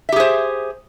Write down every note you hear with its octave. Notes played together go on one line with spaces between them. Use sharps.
G4 G#4 C5 E5